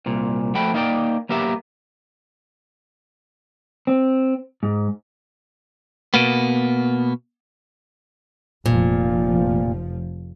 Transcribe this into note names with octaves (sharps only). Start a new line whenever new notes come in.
C2 A#2
F3 A3 F#4 G5 B5
A#3 D#4 A#4 D5 G5
F#3 A#3 B3 G4 A#4 E5
C4
G#2
B2 A#3 B3
F1 A#2 F3